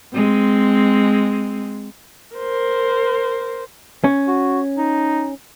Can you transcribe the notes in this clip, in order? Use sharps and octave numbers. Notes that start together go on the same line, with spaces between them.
G#3 C4
A#4 C5
C#4
F#4
D#4